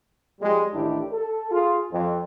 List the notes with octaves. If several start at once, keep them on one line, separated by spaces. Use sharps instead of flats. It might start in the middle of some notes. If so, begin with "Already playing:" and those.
F2 G3 G#3
A1 A2 D#3 D4 E4 G4
A4
F4 G#4
F2